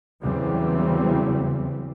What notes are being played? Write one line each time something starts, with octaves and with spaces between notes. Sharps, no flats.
E2 C#3 E3 F#3 G3 C4